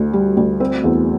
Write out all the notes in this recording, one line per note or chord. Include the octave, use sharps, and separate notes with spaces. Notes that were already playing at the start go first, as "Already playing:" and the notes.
Already playing: D2
G3
D2
C4
E2